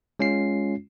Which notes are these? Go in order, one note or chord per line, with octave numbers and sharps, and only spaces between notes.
G#3 C#4 F4 C7